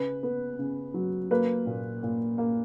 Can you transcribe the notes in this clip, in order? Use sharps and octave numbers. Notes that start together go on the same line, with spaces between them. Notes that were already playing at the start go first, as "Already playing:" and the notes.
Already playing: C#3 B4
B3
C#3
F#3
A#3 B4
A#2
A#2
A#3